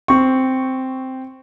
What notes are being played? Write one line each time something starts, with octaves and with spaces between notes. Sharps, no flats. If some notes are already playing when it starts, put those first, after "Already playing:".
C4 C#6